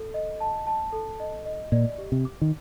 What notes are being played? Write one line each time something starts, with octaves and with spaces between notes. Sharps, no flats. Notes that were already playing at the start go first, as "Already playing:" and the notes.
Already playing: A4
D#5
A5
A5
A4
D#5
D#5
A#2 D5
G4
C3
D6
D#3